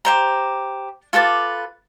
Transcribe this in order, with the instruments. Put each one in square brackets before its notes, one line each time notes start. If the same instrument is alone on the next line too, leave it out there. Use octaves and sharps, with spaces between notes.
[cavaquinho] G4 C5 A#5
F4 A4 B4 D6